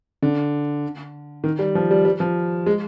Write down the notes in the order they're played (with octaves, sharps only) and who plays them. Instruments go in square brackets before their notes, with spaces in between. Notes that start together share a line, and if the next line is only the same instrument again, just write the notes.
[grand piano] D3
D#3
G3
F3
G3
G3
F3
G#3